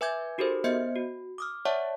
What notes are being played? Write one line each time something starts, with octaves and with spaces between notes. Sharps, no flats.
B4 E5 G#5 D6 G6 G#6
D#4 F#4 G4 A4 A#4 C5
B3 C5 D#5 E5 G6 C#7
F#4
D6 D#6 F6
C#5 D5 E5 F#5 A5 C#6